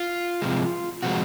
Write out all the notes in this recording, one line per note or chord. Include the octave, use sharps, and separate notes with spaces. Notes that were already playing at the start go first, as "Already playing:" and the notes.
Already playing: F4
C3 F3 G#3
C3 F3 G#3 F#4